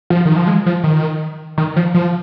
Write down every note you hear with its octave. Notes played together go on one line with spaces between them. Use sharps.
F3
D#3
F3
G#3
F3
D#3
D#3
F3
F3